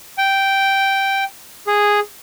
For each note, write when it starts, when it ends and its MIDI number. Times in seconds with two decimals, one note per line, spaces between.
0.18 1.24 79
1.67 2.00 68